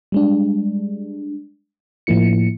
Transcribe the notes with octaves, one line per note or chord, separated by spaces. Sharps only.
G3 G#3 D4
A2 F3 A#3 E4 C#7